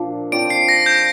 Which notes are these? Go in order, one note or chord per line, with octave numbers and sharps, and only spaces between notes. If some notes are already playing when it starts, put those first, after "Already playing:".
Already playing: A#2 F3 D4
F3 C4 F4 D5 D7
C7
A#6
G6